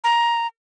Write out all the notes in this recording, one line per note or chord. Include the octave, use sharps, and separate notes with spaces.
A#5